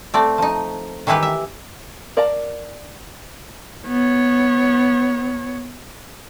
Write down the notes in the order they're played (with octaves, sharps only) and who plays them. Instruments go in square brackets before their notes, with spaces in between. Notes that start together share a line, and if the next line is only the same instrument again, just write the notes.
[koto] A3 C4 D5
F3 D#4
D#3 E3 E4 G4 B4
E5
[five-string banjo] A#4 D5 F5 A5 A#5
[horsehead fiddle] B3 C#5